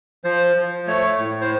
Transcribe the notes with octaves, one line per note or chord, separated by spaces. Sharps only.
F3 C5
F3
A3 C#5
A2
C5